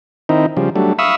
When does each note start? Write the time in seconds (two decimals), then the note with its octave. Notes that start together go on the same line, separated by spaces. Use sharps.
0.29 D#3 C4 D#4 E4
0.57 C#3 F3 G3
0.76 F#3 G3 A3 D4
0.99 E5 F5 B5 C#6 D#6 E6